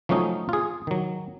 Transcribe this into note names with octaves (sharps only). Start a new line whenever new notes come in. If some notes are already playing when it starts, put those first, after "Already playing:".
F3 F#3 A3 C#4 D#4
F4 G#4
D#3 F#3